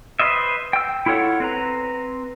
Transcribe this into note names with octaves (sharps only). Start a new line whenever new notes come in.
B4 C5 D#5 E5
G5 E6
E4 F4 A4 C#5 F#5
C4 B4 A#5